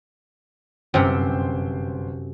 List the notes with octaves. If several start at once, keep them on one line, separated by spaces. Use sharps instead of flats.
G1 F#2 C3 C5 G5